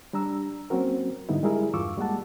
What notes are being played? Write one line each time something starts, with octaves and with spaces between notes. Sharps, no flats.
G3 D4 A#5 E6
F#3 A#3 C4 C#4 F#4 A#4
G#2 D3 G3 B3 D#4 E4
G3 G#3 E4 G#4 A#4 E5
E2 G2 F4 C#6 D6 E6
G3 G#3 A#3 F#5 A5